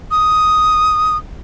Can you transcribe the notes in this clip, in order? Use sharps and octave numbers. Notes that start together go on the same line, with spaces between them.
D#6